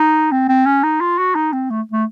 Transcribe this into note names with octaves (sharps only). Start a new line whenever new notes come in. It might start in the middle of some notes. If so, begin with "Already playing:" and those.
Already playing: D#4
C4
C4
C#4
D#4
F4
F#4
D#4
C4
A3
A3